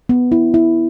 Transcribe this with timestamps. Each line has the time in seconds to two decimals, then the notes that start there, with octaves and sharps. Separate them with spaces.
0.09 B3
0.32 E4
0.54 E4